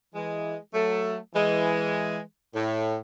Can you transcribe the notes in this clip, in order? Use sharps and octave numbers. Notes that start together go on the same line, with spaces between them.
E3 G#3
F#3 A3
E3 G#3
A2